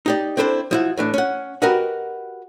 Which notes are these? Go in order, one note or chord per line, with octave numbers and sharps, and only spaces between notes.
D#4 G4 D5
C4 D4 E4 A4 B4 C5
F3 E4 F#4
A2 E3 D4
C#4 F#5
F#4 G4 A#4 B4 D#5 F#5